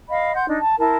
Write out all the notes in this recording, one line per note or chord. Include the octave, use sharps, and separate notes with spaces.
D#5 F5 B5 C6
F#5 C6 G6
D4 D#4
A5
E4 A#4 A5 C6